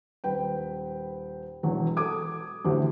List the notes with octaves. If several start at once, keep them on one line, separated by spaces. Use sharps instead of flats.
D#1 B4 G5
E1 E2 F#3
A4 D6 D#6 G#6
A1 D2 E3 G4